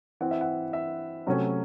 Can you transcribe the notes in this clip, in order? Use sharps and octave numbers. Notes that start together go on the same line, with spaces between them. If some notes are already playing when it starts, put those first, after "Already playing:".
E3 C4 F#5
E5
F#5
E5
C3 F#3 A3 C#4